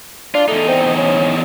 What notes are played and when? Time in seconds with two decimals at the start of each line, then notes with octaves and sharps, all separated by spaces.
0.34 D4 F4
0.48 E2 A3 D#4
0.68 C4
0.97 C#4